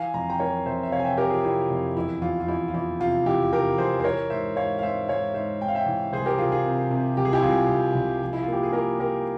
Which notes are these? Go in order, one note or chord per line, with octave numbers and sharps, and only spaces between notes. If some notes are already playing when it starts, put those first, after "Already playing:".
Already playing: E3 F5 G#5
F2 A#5
G5 A#5
E3 A#4 C#5
F2 C5 E5
E5
C3 C#5 F5
G#5
E5 G5
C3 G4 A#4
F4 G#4
C3 E4 G4
F2
E2 E4
E2 F4
F4
E2 E4
F4
E2 E4
C3 F4
E2 E4 G4
C3 G4 A#4
E2 G#4 C5
C5
E3 A#4 C#5
G#2 C5 E5
G#2 C#5 F5
F5
G#2 C5 E5
G#2 C#5 F5
G#2 C5 E5
G#2 G5
F5
E5 G5
E3
C2 G#4 C5
G4 A#4
C2 F4 G#4
F4 G#4
C3
C3
C2 G4
G#4
E4 G4
C2 F4 G#4
C2
C2
F3
E4
F4
A#3 G4
G#4
A#3 G4 A#4
F3 G4 A#4